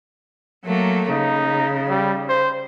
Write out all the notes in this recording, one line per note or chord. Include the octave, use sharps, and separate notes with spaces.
F#3 A3 A#3
C#3 D#4
G3
C5